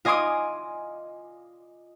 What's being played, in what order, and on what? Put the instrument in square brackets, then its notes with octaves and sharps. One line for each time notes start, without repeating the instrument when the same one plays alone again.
[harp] F4 D#5 G#5 C6 D6 D#6